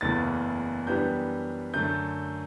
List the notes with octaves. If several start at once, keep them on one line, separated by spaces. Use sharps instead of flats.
F#1 E2 C#3 E3 A3 A6
F#2 E3 G3 B3 D4 G6
F#2 D3 A3 G6